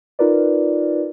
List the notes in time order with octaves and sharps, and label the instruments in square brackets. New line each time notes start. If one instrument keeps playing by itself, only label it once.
[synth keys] D#4 F4 A#4 B4 D5